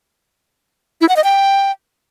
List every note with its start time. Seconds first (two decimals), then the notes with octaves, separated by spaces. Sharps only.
1.01 E4
1.09 F#5
1.16 D#5
1.24 G5